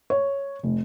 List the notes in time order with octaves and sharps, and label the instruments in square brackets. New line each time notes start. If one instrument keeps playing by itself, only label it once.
[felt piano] C#5
F1